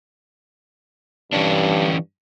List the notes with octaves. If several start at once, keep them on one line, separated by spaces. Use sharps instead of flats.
G2 E3 C#4 D4